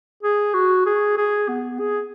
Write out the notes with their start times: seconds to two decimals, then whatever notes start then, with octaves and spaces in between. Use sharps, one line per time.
0.23 G#4
0.54 F#4
0.86 G#4
1.17 G#4
1.49 B3
1.80 G#4